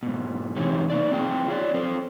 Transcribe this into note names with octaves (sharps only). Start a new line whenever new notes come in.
G#2 B2
E2 C3 C4 D#4 G4 C#5
A#3 D#4 D5
C4 F4 G#4 G5
F4 C#5 D5
C4 A4 C5